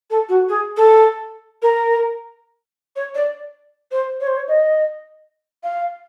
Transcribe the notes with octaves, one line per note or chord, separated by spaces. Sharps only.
A4
F#4
G#4
A4
A#4
C#5
D5
C5
C#5
C5
C#5
D#5
F5